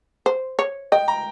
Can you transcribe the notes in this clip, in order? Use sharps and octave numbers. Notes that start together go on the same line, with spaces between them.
C5
C#5
D#5 G5
A#5